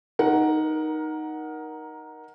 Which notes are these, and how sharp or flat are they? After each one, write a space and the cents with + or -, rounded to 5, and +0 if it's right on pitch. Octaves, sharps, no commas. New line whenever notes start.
D#4 +0 A#4 +20 F#5 +0